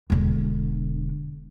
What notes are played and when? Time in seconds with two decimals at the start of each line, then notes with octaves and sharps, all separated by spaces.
0.10 E1 D3